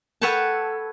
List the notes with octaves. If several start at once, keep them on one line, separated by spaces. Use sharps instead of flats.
A4 B4 C#5 F#5 G5 A5